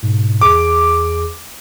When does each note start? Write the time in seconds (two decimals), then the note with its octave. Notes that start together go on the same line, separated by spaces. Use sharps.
0.03 G#2 B2
0.41 E2 G#4 D6